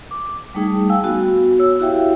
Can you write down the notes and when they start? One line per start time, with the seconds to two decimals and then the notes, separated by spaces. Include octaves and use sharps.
0.11 D6
0.55 G3 A3 D#4 G#4 G5
0.89 F5 G5 G#5 E6
1.04 B3 F#4
1.59 C#5 E6
1.79 E4 F#4 G4 E5 F5 G5